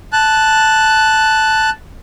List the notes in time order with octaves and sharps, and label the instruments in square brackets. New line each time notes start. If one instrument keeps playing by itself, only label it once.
[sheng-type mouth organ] A5 F#6